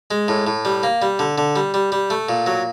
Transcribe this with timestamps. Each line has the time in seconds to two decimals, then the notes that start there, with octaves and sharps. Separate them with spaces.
0.11 G#3
0.28 A2
0.47 A2
0.65 G3
0.83 A#3
1.02 G3
1.19 D3
1.38 D3
1.56 G3
1.74 G3
1.92 G3
2.10 A3
2.29 A#2
2.46 F#3